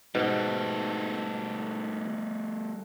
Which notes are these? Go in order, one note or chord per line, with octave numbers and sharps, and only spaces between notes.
G#2 B2 G3 A3